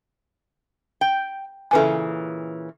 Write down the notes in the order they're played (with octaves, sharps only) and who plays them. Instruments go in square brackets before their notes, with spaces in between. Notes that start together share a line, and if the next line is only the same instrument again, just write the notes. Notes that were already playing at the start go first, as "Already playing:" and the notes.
[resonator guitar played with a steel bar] G5
[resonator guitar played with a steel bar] A#2 C#3 E3 [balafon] A4 B4 G#5